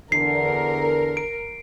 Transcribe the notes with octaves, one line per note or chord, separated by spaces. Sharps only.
E2 D3 A#4 C7
D7